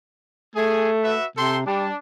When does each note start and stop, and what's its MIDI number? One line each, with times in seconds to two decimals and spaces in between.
0.56 1.14 57
0.56 0.90 68
1.04 1.26 66
1.04 1.26 71
1.04 1.26 76
1.37 1.67 48
1.37 1.57 69
1.37 1.57 79
1.37 1.57 84
1.67 1.89 55
1.67 1.97 62